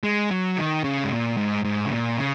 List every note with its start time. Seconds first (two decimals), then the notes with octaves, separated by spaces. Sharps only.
0.03 G#3
0.31 F#3
0.57 D#3
0.84 C#3
1.04 G#2
1.11 A#2
1.37 G#2
1.64 G#2
1.86 C#3
1.91 A#2
2.17 C#3